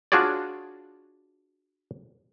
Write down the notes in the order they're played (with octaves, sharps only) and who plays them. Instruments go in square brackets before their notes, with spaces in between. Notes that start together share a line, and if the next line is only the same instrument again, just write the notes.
[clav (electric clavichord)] D4 F4 F#4 G#4 C#5 D5